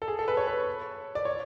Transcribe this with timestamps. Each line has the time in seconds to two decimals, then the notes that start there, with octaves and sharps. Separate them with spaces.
0.02 A4
0.08 G#4
0.19 A4
0.28 B4
0.37 C#5
0.47 B4
1.15 D5
1.25 C#5